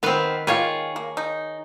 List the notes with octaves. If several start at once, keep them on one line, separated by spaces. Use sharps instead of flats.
D#3 B3 C4 B4 F5
D#3 A#3 F4 G#4 C#5
A#3
D#4